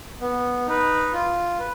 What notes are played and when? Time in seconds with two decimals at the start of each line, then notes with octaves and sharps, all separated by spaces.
0.21 B3
0.67 D#4 B4
1.13 F4
1.59 B4